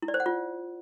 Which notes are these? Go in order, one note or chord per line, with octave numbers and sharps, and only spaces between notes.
E4
D5
C5
F#5
F4